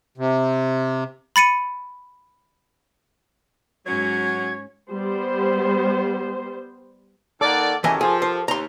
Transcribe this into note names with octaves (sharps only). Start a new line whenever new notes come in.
C3
B5 A6 C#7 D#7
G#2 F#3 C#4 C#5 G#6
G3 B3 C5
D#3 A#3 A4 D5 F#5
F#2 E3 G4 A4 A#4 D#5 G#5
F3 G#4
C5
D#2 A#5 C6